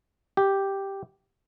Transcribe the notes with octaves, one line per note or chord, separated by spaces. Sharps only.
G4